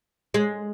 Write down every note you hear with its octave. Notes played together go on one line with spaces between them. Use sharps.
G#3